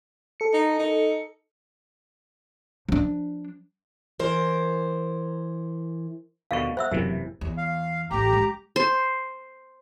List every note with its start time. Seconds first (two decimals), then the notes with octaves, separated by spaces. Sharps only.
0.40 A4 C#7
0.53 D#4
0.79 D#4
2.89 F3 D4
4.19 E3 A#4 C5
6.51 D#2 B2 D3 F5 C#6
6.77 C5 E5 F#5 E6
6.91 F#1 F#2 C3 E3
7.41 E2
7.58 F5
8.11 A1 A2 G4 A#5
8.33 G#3
8.76 C5